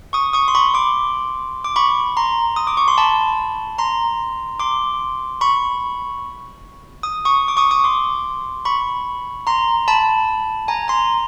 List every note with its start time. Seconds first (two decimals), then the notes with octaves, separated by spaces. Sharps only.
0.13 C#6 D#6
0.33 C#6 D#6
0.48 C6
0.55 B5 C#6
0.74 C6 D6
1.64 D6
1.76 B5 C#6
2.17 A#5 C6
2.56 D#6
2.67 D6
2.77 C#6
2.88 C6
2.98 A5 B5
3.78 A#5 C6
4.60 C6 D6
5.41 B5 C#6
7.03 D#6
7.25 C#6 D#6
7.48 D6
7.57 C#6 D#6
7.71 C#6 D#6
7.84 C6 D6
8.65 B5 C#6
9.47 A#5 C6
9.88 A5 B5
10.68 G#5 A#5
10.88 A#5 C6